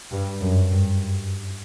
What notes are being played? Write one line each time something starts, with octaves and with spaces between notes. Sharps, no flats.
G2
F#2
G2